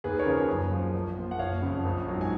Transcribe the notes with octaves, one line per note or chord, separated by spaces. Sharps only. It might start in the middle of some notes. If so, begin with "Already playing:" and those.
D#2 G#4 B4
A#4 C#5
C#3 F3
F#1
F#2 F3
A#1
A#2 F3
F#5
F#1 C#5 F5
F2 C#3
A#1
G#2 F#3
G#5